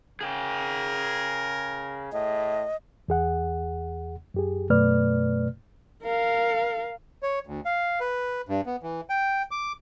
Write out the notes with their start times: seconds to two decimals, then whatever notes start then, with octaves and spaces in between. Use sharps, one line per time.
0.21 C#3 G#4 A#4 G5
2.12 A2 D#5
3.08 E2 G#4 F#5
4.34 F#2 G4 G#4
4.70 F#2 B2 A3 B4 D5 F6
6.03 A#4 F5
7.23 C#5
7.47 D2
7.65 F5
8.00 B4
8.49 G2
8.66 B3
8.83 E3
9.10 G5
9.51 D6